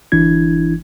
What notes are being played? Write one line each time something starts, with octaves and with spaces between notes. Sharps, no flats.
G1 E3 D4 E4 G#6